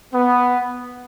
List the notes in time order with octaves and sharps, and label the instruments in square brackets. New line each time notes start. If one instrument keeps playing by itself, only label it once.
[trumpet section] B3